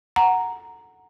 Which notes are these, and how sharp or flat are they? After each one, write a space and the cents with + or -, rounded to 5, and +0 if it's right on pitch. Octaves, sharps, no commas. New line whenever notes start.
F#5 +0 A#5 +0